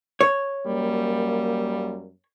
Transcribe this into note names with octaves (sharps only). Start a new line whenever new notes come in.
C#5
F#2 G3 A#3